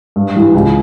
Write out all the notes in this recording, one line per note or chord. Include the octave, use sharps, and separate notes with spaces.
G2
E3 G3
C#2